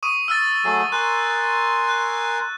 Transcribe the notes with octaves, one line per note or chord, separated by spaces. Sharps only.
C#6 D#6 D#7
E6 F6 A6
F#3 A3 G#4
A#4 G#5 C6 F#6
F#6